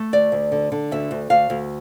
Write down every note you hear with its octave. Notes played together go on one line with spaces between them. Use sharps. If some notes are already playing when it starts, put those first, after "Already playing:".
Already playing: A3
D2 D5
D2
D3
D3
D2 E5
D2
D2 F5
D2